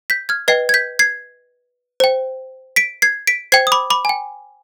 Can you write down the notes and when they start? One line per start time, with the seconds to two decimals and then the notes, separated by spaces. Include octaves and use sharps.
0.10 G6 B6
0.29 F6 G#6
0.48 B4 D#5 G5 G#6 C7
0.69 G#6
0.74 G6 B6
0.99 G#6 C7
2.00 C5 G5
2.76 B6 D7
3.02 G#6 C7
3.27 B6 D7
3.52 C5 G5 G#6 C7
3.67 D#6
3.72 B5 D6
3.90 B5 D6
4.05 G#5
4.09 G5